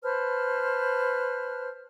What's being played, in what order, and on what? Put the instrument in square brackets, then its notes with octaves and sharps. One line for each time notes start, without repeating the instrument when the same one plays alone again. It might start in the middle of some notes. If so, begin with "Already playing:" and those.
[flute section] B4 C5 A5 F6